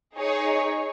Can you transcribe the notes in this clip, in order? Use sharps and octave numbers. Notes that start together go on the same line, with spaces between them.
D#4 G#4 C#5